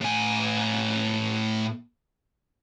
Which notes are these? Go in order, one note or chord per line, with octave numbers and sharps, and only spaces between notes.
A2 G#5